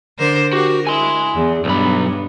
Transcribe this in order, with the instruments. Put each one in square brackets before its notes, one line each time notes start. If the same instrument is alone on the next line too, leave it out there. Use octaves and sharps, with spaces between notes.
[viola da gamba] D3 A#4 C5
[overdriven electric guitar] F#4 [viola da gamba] G4 A#4
[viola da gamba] E4 [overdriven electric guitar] G#5 C6
[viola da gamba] E2
[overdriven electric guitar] B1 B5 [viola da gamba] G2 B3